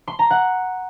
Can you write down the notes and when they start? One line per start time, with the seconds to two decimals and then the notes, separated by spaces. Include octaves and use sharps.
0.07 C6
0.19 A#5
0.30 F#5